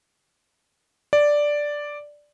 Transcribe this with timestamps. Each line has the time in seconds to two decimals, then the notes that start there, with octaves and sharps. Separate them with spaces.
1.13 D5